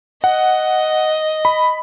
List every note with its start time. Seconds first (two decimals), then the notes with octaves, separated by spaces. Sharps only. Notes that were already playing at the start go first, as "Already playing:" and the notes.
0.24 D#5 F#5
1.45 B5